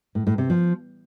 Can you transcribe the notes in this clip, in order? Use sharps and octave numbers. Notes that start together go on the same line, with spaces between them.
A2
A2
C3
F3